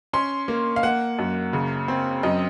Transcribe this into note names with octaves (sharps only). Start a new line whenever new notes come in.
C#4 C6
A#3
F5
A#3 F#5
F#2
C#3
C4
F#2 D#5